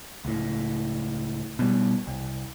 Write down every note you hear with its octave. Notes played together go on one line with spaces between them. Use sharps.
C#2 A2
B2 G3
C2